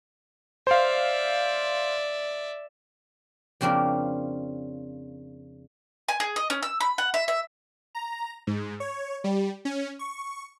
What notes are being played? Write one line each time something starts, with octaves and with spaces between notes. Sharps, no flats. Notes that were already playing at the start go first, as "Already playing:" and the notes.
C5 D5 E5 F5
F2 C#3 A#3 C4 D4
G#5
G#4
D#5
C#4
E6
B5
F#5
E5
E5
A#5
G#2
C#5
G3
C#4
C#6